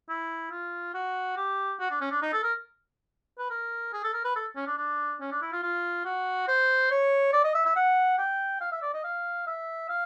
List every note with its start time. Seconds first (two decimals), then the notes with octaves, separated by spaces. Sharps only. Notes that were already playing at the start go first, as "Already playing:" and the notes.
0.09 E4
0.51 F4
0.94 F#4
1.37 G4
1.80 F#4
1.91 D4
2.01 C#4
2.11 D4
2.22 D#4
2.33 A4
2.44 A#4
3.39 B4
3.50 A#4
3.93 G#4
4.04 A4
4.14 A#4
4.25 B4
4.36 A4
4.56 C#4
4.67 D4
4.77 D4
5.21 C#4
5.32 D4
5.42 E4
5.52 F4
5.63 F4
6.05 F#4
6.48 C5
6.91 C#5
7.33 D5
7.44 D#5
7.55 E5
7.65 E5
7.76 F#5
8.18 G5
8.61 F5
8.72 E5
8.82 D5
8.94 D#5
9.04 F5
9.47 E5
9.89 F5